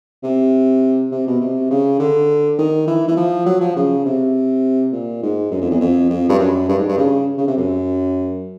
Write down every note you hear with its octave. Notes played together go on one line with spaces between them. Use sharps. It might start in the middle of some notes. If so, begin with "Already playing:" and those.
C3
C3
B2
C3
C#3
D3
D#3
E3
E3
F3
F#3
F3
C#3
C3
A#2
G#2
F#2
F2
E2
F2
F2
G2
F#2
G2
G#2
G2
C#3
C#3
C3
F#2